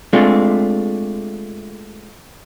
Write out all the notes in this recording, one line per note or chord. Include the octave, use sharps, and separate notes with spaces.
G#3 A3 C4 D4 F4